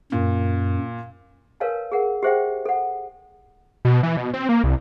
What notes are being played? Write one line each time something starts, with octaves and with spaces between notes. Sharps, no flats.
F#2 A#2
A#4 B4 C#5 F5 G#5 A5
G#4 A#4 F#5
G4 G#4 C5 E5 F#5 G5
A4 F#5
B2
E3
B2
C4
A#3
C2